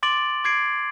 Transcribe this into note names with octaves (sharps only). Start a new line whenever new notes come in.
C6 D6 A6 D7 F#7
D6 G#6 C7 D7